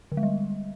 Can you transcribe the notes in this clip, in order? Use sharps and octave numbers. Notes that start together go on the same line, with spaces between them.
D3
G#3
G3